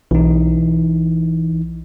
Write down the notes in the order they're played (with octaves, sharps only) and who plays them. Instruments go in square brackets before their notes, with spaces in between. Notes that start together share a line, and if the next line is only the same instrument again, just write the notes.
[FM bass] B1 [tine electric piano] E3 D#4